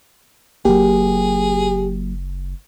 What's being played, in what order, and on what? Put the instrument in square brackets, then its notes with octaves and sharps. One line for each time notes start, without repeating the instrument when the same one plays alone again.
[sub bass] F#1 [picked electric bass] F#3 A#3 [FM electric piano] G4 [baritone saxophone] G#4